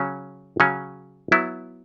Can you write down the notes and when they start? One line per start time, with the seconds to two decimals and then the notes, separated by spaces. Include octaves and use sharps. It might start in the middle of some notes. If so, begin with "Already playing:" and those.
Already playing: C#3 F#3 C#4
0.60 C#3 F#3 C#4
1.32 F#3 B3 E4